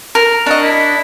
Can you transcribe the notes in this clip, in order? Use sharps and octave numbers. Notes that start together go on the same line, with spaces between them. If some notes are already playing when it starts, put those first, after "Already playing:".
A#4
D4 F#4 D#5
E4